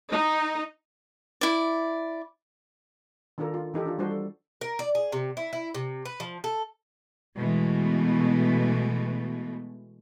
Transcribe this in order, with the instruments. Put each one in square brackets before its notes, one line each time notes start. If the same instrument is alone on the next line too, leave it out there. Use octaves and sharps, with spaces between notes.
[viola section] D#4
[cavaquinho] E4 D5
[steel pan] D#3 D4 F4 A4 A#4
F4
E3 D#4 G4 A4
D4 F4
G3 D4 F#4 C5
A4
[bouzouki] A#4
D5
G#4
C3
E4
E4
C3
B4
F3
A4
[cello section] B2 E3 G#3 A3